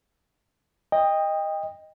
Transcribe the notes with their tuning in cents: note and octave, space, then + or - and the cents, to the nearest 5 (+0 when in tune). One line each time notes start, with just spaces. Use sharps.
D#5 +0 G5 +25